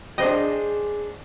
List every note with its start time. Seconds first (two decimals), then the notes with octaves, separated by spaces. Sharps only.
0.18 D4 G#4 C5 D#5 G5